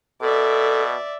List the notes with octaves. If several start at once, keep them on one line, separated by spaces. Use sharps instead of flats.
B2 A4 D5 E5